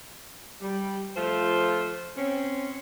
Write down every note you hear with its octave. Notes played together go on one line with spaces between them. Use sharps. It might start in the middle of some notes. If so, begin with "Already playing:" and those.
G3
F3 A3 F4 C5
C4 C#4